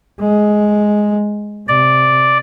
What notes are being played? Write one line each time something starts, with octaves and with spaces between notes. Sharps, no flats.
G#3
C3 D5